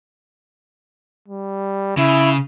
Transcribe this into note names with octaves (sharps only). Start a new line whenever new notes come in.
G3
C#3 E4